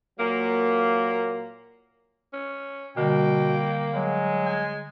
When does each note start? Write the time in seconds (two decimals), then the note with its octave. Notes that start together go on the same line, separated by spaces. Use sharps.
0.19 A#2 F#3 A#3
2.33 C#4
2.97 B2 D3 G3 A#3 G5
3.94 F#3 G#3
4.46 G#5